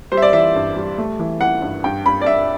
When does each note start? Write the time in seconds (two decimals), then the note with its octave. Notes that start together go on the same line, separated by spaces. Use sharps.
0.12 G3 C5
0.17 E5
0.22 D5
0.33 E3 E5
0.55 G2
0.76 G3
0.98 A3
1.19 E3
1.41 E3 F#5
1.62 G2
1.84 G2 G5
2.06 G2 B5
2.21 D5
2.26 G2 E5